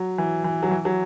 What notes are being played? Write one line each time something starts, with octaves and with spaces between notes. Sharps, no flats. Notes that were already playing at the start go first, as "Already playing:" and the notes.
Already playing: F#3
E3
E3
F#3
E3
F#3